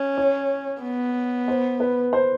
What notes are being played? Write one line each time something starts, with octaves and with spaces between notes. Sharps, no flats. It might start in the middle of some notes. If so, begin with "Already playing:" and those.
Already playing: C#4
C#5
B3
C5
B4
C5